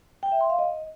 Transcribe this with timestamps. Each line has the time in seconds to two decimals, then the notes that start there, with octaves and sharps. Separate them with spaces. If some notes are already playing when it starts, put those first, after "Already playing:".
0.23 G5
0.32 E5
0.41 C6
0.50 F5
0.59 D#5